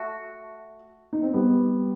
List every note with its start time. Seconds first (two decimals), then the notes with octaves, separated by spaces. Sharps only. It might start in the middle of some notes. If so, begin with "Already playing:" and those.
Already playing: A3 F#4
1.13 D#4
1.23 C4
1.33 G3 B3